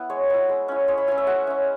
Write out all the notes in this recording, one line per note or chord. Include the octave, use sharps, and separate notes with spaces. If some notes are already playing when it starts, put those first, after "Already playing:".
Already playing: B3 E4 B4
G#3 C#5
B3 E4
G#3
C#4 E4
G#3 C#5
B5
C#4 E4 G#5
E5
G#3 F#5
C#4 E4